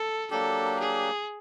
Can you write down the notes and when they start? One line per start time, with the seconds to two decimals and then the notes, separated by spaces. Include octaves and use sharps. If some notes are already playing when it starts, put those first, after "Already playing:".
Already playing: A4
0.30 F#3 A#3 D4 G4 A4
0.80 G#4